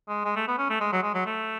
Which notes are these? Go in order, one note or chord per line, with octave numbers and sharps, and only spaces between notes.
G#3
G#3
A3
B3
C#4
A3
G#3
F#3
G#3
F#3
A3